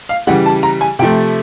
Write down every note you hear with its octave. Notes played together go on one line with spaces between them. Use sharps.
F5
C#3 E3 G3 F#5
A5
A#5
G#5
C3 F3 A3 G5